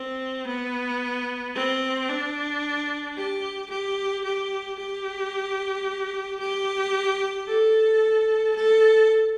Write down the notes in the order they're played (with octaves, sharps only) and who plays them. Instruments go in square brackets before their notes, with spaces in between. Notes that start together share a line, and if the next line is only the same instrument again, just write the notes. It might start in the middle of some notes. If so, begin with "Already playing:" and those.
Already playing: [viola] C4
B3
C4
D4
G4
G4
G4
G4
G4
A4
A4